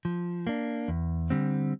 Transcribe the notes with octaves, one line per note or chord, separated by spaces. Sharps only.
F3
A#3 D4
E2
D3 G3 C4